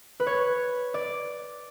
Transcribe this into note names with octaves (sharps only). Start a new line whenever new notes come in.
B4
C#5
D5